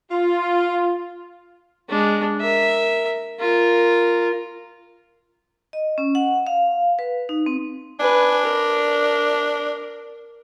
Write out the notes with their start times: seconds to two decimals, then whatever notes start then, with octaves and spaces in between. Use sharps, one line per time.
0.10 F4
1.89 G#3 D4
2.41 A#4 E5
3.40 F4 A#4
5.73 D#5
5.98 C#4
6.15 F#5
6.47 F5
6.99 B4
7.29 D#4
7.46 C4
8.00 D4 B4 G#5
8.45 A#4